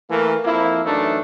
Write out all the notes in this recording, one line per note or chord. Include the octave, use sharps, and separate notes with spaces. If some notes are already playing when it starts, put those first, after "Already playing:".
E3 A3 A#3 A#4
F2 F3 A#3 E4
F#2 E3 A3 D4 D#4